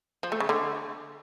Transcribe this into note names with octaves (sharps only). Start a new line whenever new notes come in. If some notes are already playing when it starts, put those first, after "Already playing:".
F3
A3
C#3
D3